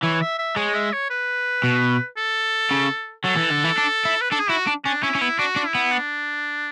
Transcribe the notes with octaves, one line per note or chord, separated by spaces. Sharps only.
E3 C#5
E5
E5
G#3 C#5
E5
C#5
B4
B2
A4
C#3
F#3 A4
E3
D3
E3
D4
E4
B4
D4 A4
G#4
E4 F#4
D4
C#4 D4
C#4 E4
C#4
B3 E4
D4 F#4
D4
E4
B3
D4